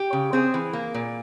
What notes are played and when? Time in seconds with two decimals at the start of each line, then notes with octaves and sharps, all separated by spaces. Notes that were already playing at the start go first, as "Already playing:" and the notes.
Already playing: G4
0.13 C#3
0.33 C4 G#4
0.54 E3
0.73 A#3
0.94 A#2